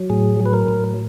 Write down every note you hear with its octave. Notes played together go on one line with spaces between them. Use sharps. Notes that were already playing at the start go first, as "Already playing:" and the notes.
Already playing: F#3
A2 G#4
F#3
B4
A#4
A2